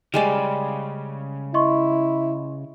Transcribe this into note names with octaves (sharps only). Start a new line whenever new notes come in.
C#3 G3 G#3 D5
E4 D#5 C6 C#6